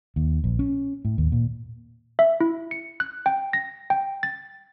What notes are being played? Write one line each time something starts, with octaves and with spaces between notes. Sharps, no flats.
D#2
A#1
C#4
A2
D#2
A#2
E5
E4
C#7
F#6
G5
A#6
G5
A6